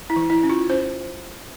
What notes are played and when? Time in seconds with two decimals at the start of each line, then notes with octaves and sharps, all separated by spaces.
0.10 E4
0.16 E3
0.30 E4
0.43 C#4
0.50 F4
0.70 C#4 C5